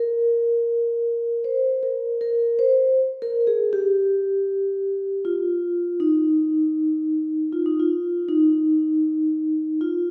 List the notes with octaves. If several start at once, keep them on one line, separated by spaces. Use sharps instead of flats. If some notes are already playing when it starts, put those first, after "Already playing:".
Already playing: A#4
C5
A#4
A#4
C5
A#4
G#4
G4
F4
D#4
F4
D#4
F4
D#4
F4